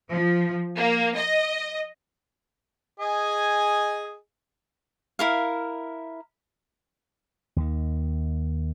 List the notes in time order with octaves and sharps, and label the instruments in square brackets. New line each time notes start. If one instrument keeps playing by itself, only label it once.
[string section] F3
A#3
D#5
[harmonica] G#4 D#5 G#5
[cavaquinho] E4 A#4 F5
[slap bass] D#2 D#3